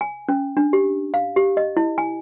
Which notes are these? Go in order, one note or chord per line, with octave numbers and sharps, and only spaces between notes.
G#5
C#4
D4
G4
F5
G4
D#5
E4
G#5